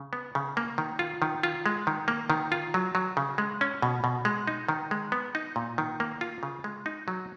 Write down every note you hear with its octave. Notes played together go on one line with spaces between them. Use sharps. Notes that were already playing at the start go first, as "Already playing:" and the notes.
Already playing: C#3
B3
C#3
A#3
D#3
F4
D#3
F4
G#3
D#3
A#3
D#3
F4
F#3
F#3
C#3
G#3
C#4
B2
B2
G#3
D#4
D#3
G#3
B3
D#4
A#2
D#3
A#3
F4
C#3
G#3
D#4
F#3